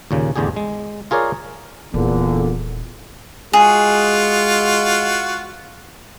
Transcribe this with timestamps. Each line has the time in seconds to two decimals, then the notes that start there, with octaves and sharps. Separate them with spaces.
0.11 D#2 A#2 C#3
0.36 A1 E2 D3 G4 G#4
0.56 G#3
1.11 F4 G#4 A#4 C#5 D5 F5
1.94 D#1 E2 A#2 D3
3.53 G#3 F4 F#4 G#4